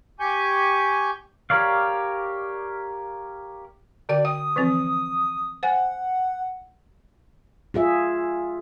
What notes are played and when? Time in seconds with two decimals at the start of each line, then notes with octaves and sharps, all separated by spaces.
0.20 G4 G#5 C#6 G6
1.50 G4 A#4 C#5 D5 F5
4.09 D3 F#4 D5 G5
4.25 G5 D#6
4.56 E3 F3 C4
5.63 C5 F#5 G#5
7.74 F4 G#4 E5